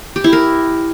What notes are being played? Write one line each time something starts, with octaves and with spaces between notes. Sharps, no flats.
G4
E4
A#4